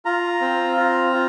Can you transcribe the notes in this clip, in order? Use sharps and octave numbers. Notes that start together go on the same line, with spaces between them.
F4 A#5
C4
F4
F4